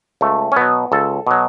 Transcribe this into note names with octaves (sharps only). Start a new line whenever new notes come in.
C#2 A3
C#4
B2 F#3 B3
C#2 A4
B2 F#3